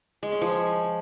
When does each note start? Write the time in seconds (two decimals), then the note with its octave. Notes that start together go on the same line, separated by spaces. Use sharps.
0.23 G#3
0.32 C#4
0.41 F3